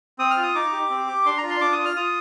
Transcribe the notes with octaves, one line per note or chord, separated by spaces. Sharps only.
C4 D#6
F6
F4
D#6
D#4 D6
G4
C4
G4
D4 C6
A#5
F4
C6
D4 D6
D#6
F4
F6
F4 D#6